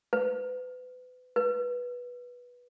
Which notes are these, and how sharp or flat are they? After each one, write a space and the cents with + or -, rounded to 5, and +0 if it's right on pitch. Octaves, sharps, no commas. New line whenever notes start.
B4 +30
B4 -10